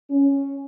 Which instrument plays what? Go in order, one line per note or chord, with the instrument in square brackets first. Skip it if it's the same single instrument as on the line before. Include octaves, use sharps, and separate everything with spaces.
[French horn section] C#4